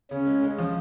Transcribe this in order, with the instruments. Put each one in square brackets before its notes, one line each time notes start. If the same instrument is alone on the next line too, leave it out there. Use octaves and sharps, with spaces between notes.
[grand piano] C#3 [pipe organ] C#4
[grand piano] G#3
G#3
F3